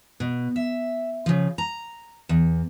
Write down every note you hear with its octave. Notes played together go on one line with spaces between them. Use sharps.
B2
E5
C#3 F3
A#5
E2